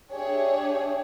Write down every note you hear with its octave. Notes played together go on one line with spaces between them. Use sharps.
D4 G4 G#4 C#5 E5